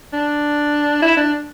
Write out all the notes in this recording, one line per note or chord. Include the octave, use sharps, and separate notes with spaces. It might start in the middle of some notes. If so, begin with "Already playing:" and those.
D4
E4
D4